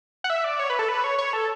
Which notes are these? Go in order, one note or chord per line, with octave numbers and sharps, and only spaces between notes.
F#5
E5
D5
C#5
B4
A4
B4
C#5
C#5
A4